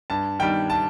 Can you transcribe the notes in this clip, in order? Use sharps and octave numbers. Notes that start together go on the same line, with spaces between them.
G2 A5
D#3 G3 G5
A5